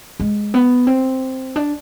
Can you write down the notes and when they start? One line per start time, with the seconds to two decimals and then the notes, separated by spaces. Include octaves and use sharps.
0.20 G#3
0.54 B3
0.87 C4
1.56 D4